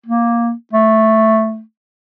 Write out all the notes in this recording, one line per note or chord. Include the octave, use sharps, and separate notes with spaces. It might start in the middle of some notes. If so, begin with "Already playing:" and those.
A#3
A3